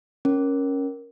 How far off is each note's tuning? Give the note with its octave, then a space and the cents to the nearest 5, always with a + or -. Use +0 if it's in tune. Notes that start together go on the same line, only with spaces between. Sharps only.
C#4 -5 A#4 +10